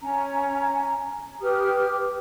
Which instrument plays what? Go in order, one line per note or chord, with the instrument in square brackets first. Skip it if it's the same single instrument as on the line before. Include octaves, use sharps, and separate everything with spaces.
[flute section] C#4 A#5
G4 B4 D#6 F6